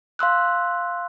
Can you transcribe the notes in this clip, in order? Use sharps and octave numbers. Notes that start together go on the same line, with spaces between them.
F5 C6 E6 F#6